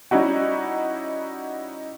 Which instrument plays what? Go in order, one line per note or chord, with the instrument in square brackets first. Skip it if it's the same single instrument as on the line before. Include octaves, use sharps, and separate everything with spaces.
[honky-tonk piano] G3 C#4 D#4 E4 F#4